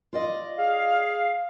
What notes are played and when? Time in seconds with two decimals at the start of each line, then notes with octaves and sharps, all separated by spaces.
0.13 F4 D5 D#5
0.57 G#4 F5